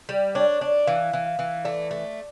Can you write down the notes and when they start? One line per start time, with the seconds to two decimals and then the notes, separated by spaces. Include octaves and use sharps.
0.09 G3
0.35 D4 C#5
0.61 D4 D5
0.87 E3 F5
1.13 E3
1.26 F5
1.39 E3
1.65 A3 D5
1.91 A3